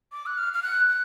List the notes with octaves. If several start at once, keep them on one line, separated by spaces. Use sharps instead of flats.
D6
F#6
F6
F6
F#6
F#6